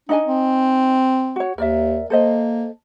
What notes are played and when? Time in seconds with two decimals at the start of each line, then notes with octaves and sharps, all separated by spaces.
0.09 D4 D#4 D#5 G#5
0.25 C4
1.36 F#4 C#5
1.58 D#2 A#4 D5 E5
2.10 A#3 A4 C5 D#5